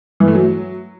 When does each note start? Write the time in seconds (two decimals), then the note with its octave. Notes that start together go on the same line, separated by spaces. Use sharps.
0.20 E3
0.28 A3
0.35 F#3